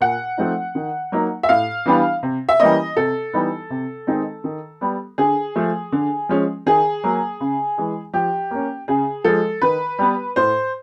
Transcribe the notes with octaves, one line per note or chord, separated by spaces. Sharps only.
A#2 F#5
F3 A3 C4 D#4
D#3
F#3 A#3 D#4
E5
A2 F5
E3 G3 B3 D4
C3
E5
E3 G3 A#3 C#4 D#5
C3 A4
E3 G3 B3 D#4
C3
D#3 G#3 C4 D#4
D#3
G3 B3
D3 G#4
F3 A3
D3
F3 G#3 C#4
D#3 G#4
F#3 A#3
C#3
E3 G#3
F3 G4
A#3 C#4
C#3 G#4
F3 G#3 A4
D#3 B4
G3 B3
A2 C5